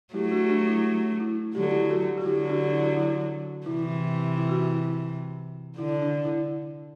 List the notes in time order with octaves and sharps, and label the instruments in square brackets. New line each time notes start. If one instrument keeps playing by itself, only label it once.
[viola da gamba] F#3 A3 [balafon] E4 G4
[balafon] D4 F#4
G4
D4 F#4
E4
E4
[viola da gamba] D3 F#3 [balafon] G4
[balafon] A4
E4 G4
F#4 A4
F#4
[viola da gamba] D3 F#3 [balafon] E4 G4
[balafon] G4
D4 F#4
E4
F#4
E4
[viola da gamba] C3 E3 [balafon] E4
[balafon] E4
F#4
E4
[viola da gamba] D3 [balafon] E4
[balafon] D4
E4